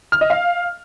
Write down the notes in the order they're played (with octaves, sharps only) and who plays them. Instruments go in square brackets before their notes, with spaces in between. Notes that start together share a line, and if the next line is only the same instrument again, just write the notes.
[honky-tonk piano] F6
D#5
F5